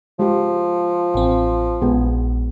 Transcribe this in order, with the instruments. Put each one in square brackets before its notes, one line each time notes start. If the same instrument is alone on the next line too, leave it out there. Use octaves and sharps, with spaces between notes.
[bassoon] F3 [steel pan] G#3 G4
[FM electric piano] A1 C4
[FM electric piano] A#1 [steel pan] G#3 B3 G#4